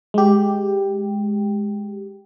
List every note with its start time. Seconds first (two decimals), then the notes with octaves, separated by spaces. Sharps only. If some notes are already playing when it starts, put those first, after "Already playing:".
0.14 G#3 G4